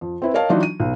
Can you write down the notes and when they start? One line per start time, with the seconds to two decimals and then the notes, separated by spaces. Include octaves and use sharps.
0.01 F2
0.22 C4 E4 B4
0.34 A#4 C#5 D#5 F5 A5
0.49 E3 F#3 D4 D#4 F4 F#4
0.63 D#7
0.80 B1